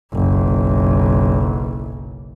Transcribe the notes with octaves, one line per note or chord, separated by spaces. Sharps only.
F#1 B1